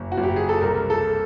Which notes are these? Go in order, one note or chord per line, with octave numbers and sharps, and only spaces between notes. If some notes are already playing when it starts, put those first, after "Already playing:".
Already playing: F#1
F#4
F#1
G4
G#4
A4
C2 A#4
A4